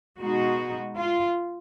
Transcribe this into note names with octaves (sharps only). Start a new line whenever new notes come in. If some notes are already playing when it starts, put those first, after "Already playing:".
B2 G#3 D#4 F#4
F4